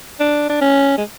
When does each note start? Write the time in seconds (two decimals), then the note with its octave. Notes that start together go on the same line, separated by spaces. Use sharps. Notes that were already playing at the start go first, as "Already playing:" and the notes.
0.20 D4
0.49 D4
0.61 C#4
0.98 G#3